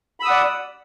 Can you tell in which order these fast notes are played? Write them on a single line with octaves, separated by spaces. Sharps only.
B5 E6 D#6 F#5 D5